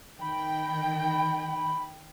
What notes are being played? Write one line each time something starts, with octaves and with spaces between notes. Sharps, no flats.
D#3 G5 B5